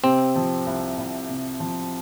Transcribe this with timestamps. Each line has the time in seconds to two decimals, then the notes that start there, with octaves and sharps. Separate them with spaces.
0.04 C3 C4
0.36 F3
0.67 C2
0.98 C2
1.29 C3
1.60 F3